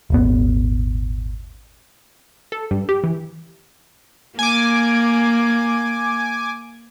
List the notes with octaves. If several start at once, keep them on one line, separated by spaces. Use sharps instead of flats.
D#1 G#1 B3
A4
G2
G4
E3
A#3 G#5 D6